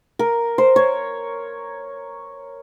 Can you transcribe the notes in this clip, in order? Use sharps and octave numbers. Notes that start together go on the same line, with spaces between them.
A#4
C5
C#5